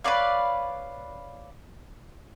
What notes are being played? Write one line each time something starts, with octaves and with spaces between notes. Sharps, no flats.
B4 C#5 D5 F5